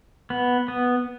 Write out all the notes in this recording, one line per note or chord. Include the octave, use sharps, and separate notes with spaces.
B3
B3